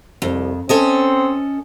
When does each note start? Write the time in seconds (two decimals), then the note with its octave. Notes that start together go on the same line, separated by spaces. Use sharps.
0.22 C2 F2
0.69 C4 C#4 A4 D#5